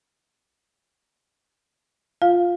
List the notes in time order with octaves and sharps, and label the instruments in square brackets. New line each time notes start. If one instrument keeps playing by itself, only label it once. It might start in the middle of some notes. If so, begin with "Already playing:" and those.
[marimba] F4 [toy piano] F5